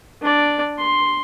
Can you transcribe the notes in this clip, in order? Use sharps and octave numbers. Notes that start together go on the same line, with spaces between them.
D4 D5
C6